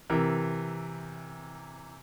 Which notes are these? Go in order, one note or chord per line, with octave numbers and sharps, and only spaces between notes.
C3 E3 A#4